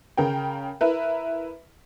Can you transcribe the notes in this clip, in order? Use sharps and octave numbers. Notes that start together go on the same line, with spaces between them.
C#3 A#4 G5
E4 A#4 B4